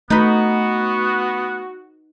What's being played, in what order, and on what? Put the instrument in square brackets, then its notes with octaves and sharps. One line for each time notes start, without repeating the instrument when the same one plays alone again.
[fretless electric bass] A3 [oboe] B3 [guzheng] D#4 B4 [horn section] F#4